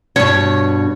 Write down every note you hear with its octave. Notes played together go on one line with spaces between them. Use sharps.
G2 B2 C#5